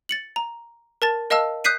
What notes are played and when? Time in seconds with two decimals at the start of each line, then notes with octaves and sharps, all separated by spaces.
0.09 A6 C#7 F#7
0.36 A#5
1.02 A#4 A5 A6
1.30 A#4 D#5 F5 A5 E6 F6
1.64 D#6 F#6 G6 B6 C7 D#7